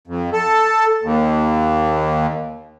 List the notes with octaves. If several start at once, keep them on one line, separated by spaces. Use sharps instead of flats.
F2
A4
D#2